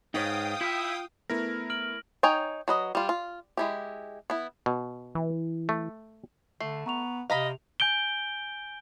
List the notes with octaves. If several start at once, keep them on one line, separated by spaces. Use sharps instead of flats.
G#2 D#4 B4 C#5 F5 G5 D#6
E4 F4
A3 B3 E4 A#4 F6 A#6
F6 D7 F#7
D#4 C#5 G5 G#5
F#3 B4 D#5
G3 F4
F4
G#3 E4 G4
B3 E4
B2
E3
A3
D3 A3 C7
B3 A#5 C#6 F7
C3 D#5 F5 A#5 B5 F7
G#5 G6 D7 G7